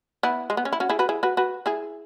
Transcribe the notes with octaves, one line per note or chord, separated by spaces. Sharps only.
B3 E4
G#3
B3
C#4
E4
C#4 F#4
E4 G#4
F#4 B4
E4 G#4
F#4 B4
F#4 B4
E4 G#4